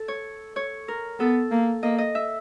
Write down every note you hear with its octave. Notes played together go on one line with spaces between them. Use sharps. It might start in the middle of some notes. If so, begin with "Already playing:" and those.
Already playing: A4
C#5
C#5
A#4
B3 A4
A#3
A#3 D#5
D#5
E5